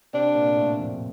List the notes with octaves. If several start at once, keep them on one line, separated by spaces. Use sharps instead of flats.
C3 C4 D4
A#2 A#3
A2 A3
F2 F3